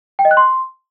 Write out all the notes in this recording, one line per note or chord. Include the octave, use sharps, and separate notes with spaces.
G5
D#5
F#6
C6